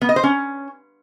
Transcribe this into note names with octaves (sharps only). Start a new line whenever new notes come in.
B3
D#5
C5
C#4